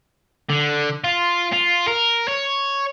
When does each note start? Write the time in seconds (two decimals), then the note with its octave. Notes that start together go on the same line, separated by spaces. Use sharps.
0.49 D3
1.04 F4
1.53 F4
1.88 A#4
2.28 C#5